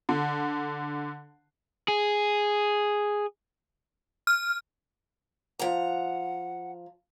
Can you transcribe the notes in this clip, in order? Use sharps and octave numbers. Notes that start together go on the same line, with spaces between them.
D3
G#4
F6
F3 F#5 A#5